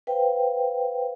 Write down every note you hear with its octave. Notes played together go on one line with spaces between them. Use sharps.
B4 C5 F5 G5